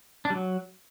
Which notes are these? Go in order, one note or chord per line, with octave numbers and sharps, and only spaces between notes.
D4
G3
F#3